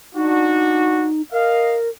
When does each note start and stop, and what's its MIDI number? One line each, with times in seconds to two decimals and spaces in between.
0.15 1.09 62
0.15 1.22 63
0.15 1.09 66
1.32 1.89 70
1.32 1.79 75
1.32 1.79 77